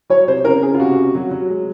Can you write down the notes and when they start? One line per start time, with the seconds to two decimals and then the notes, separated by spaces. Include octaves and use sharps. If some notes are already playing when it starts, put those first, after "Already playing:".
0.10 F#3 C#5
0.27 C3 C5
0.44 C#3 A#4
0.62 C#3 G#4
0.74 F4
0.80 C3 F#4
0.97 C3
1.15 F#3
1.31 F#3
1.50 G#3